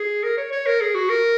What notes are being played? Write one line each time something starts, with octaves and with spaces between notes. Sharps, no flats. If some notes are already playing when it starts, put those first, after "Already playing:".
Already playing: G#4
A#4
C#5
C#5
A#4
G#4
F#4
A#4